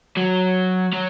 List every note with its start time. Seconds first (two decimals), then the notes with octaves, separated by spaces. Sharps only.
0.17 F#3
0.93 F#3